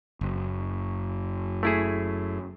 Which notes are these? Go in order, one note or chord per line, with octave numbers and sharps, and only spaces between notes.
F#1
A3 E4 G#4